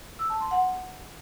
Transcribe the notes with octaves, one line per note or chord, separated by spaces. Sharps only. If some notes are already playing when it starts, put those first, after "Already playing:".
E6
A5
C6
F#5